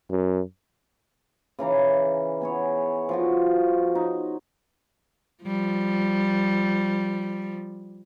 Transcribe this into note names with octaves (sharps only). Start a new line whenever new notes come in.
F#2
C#3 E3 A#5 D6
B3 G#4 C#5
F3 F4 F#4
D#4
F3 G3